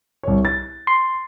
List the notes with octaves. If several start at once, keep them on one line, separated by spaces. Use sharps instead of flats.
C2 C#5
A6
C6